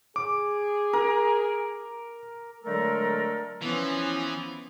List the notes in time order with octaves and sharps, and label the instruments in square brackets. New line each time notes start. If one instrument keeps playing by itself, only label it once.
[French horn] G#4 [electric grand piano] D6
[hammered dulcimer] A#4
[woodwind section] D3 F#3 G#3 A3 A4 A#4
[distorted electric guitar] E3 [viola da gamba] F3 B3 C#4